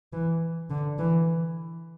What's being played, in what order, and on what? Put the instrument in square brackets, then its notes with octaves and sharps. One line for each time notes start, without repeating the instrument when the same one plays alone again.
[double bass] E3
D3
E3